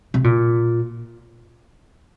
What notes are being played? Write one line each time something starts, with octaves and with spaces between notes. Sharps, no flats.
C3
A#2